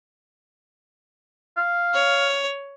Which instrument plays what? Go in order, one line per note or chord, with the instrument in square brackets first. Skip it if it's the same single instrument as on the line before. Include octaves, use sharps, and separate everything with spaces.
[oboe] F5
[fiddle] C#5